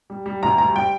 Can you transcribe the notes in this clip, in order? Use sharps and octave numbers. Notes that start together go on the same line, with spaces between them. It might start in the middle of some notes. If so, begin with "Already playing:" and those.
G3
G3
D2 A#5
G3 A#5
G3 G5